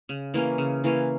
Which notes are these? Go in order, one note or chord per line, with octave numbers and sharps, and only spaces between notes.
C#3
E3 A#3 C#4
C#3
E3 A#3 C#4